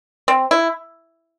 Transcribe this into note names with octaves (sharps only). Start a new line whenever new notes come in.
C4
E4